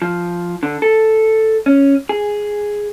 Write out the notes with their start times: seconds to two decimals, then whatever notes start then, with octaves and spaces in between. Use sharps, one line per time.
0.02 F3
0.63 D3
0.82 A4
1.66 C#4
2.09 G#4